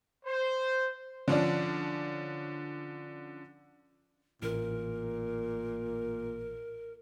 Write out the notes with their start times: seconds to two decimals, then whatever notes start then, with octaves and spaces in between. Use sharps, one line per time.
0.25 C5
1.28 D3 F3 C#4 D4
4.42 A1 A#2 A#4